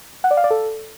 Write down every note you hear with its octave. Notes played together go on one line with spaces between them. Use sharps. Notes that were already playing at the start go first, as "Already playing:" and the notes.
F#5
D5
F5
D5
A4